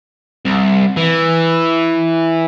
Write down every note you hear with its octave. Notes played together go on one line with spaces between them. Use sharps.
C2
E3